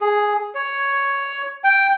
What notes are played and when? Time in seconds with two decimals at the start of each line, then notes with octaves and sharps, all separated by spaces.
0.01 G#4
0.55 C#5
1.64 G5